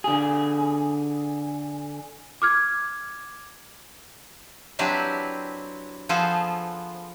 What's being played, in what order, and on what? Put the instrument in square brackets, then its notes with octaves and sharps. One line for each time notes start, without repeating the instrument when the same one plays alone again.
[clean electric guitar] D3 G#4
[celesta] D6 F6 G#6
[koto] F#3 C4 D4 E4 G4 B4
F3 B3 F4 G#4 A4 C5